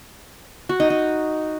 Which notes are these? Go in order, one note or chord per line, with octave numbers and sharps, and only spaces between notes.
F#4
D#4
D#4